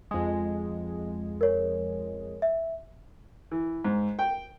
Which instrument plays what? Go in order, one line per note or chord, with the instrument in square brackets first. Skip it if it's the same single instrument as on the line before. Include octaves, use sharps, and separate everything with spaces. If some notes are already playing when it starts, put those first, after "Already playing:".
[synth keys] F2 G#3
[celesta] A#4 C#5
E5
[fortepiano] E3
G#2
G5